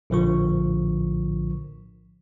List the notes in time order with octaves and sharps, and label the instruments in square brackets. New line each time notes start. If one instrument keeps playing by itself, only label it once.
[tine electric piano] A#1 A2 D3 F3 A#4 C#6